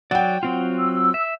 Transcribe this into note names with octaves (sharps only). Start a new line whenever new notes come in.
F#3 D5 F#5 G5
F#3 C4 F4
E6
E5